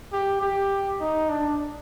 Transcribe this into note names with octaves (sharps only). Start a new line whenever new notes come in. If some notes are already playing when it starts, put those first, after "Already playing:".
G4
G4
D#4
D4